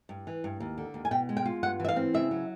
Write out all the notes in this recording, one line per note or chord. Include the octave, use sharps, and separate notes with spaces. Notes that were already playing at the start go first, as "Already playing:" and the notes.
G2
E3
G2
D#2
D3
D#2
G#5
B2 G5
G#3
G5
F4
G2 F#5
E3 E5
F5
C4
C#3 E5
F#3